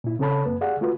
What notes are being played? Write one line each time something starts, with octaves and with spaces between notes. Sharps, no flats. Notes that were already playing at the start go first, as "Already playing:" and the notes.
A#2 E4
C#3 C4 A4 C#5 A5 B5
F#2 A#3 B4
G4 G#4 D5 F5 F#5
A3 F4 F#4 B4